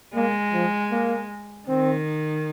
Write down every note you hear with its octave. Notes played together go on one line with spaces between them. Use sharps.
G#3 A#3
F3
A#3
D#3 C4